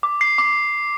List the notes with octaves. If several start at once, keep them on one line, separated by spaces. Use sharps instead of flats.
D6
C7
D6